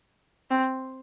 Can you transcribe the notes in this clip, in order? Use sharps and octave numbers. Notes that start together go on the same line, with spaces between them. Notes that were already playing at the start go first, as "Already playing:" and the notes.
C4